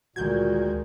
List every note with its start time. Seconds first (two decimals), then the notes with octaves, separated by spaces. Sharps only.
0.16 D2 A#2 D#3 G#3 F#4 G6 G#6